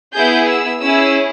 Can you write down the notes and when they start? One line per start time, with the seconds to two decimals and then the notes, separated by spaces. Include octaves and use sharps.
0.14 B3 E4 G#4 G6
0.47 E6
0.80 C#4 E4 G#4 E6